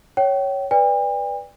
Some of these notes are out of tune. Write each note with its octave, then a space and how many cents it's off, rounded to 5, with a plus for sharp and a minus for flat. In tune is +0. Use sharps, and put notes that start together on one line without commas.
C#5 +0 G5 -30
B4 +0 D5 +0 G5 +45